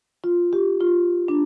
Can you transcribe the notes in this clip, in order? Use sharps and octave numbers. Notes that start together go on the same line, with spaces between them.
F4
G4
F4
D4